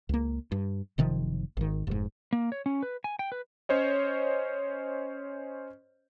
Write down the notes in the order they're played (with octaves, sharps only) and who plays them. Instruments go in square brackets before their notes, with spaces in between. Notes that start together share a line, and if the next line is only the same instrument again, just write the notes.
[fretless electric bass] C#2 A#3
G2
F#1 C3 D#3 F3
G#1 D#3
F1 G#2
[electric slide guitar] A#3
C#5
C#4
B4
G#5
G5
B4
[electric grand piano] C#4 C5 C#5 D#5